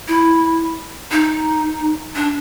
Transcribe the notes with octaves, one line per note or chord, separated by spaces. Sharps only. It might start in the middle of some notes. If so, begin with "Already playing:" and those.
E4
D#4
D4